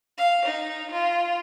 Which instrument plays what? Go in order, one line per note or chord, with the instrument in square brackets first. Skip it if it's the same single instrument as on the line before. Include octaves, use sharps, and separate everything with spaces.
[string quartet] F5
D#4
F4